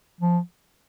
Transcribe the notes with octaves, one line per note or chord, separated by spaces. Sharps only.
F3